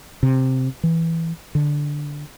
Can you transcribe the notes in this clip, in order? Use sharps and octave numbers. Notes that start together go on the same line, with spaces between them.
C3
E3
D3